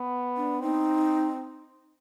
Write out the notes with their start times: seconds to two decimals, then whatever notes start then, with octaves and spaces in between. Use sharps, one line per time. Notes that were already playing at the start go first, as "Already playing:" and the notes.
Already playing: B3
0.37 D4
0.61 C4 D#4